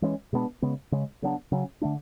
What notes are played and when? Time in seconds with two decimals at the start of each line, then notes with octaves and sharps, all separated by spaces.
0.02 E3 G#3 C#4
0.33 B2 G#3 B3 D4
0.62 C#3 G#3 B3
0.92 C#3 G#3 C#4
1.22 C#3 F#3 B3 D4
1.52 C#3 F#3 C#4
1.81 D3 A3 D4